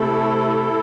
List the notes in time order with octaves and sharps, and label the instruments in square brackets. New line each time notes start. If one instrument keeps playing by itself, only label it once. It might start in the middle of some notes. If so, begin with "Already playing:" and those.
Already playing: [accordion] C3 A3 E4 A4